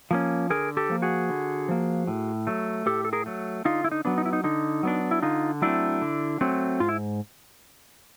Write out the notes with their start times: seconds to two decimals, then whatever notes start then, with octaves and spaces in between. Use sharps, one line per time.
0.11 F3 A#3 C#4
0.50 D3 G#4 A#4
0.77 G4 A4
0.89 F3 A#3
1.02 F#4 G#4
1.29 D3
1.69 F3 A#3
2.07 A2
2.47 F#3 A3
2.86 A2 G4 A4
3.05 A4
3.13 G#4 A#4
3.26 F#3 A3
3.65 D3 D#4 F4
3.84 E4
3.91 D#4
4.05 F#3 B3 D4
4.18 D#4
4.26 E4
4.33 D#4
4.44 D3 D#4
4.83 F#3 B3 D4
5.11 E4
5.22 D3 D#4 F4
5.62 F#3 A3 C4 D4 E4
6.02 D3
6.41 F#3 A3 C4
6.80 G#2 F4
6.88 E4